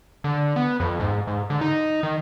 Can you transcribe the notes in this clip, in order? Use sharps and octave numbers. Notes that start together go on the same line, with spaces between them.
D3
B3
F2
G#2
G#2
D3
D#4
D#3